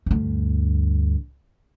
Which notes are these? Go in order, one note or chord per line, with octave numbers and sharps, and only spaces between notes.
D2 G2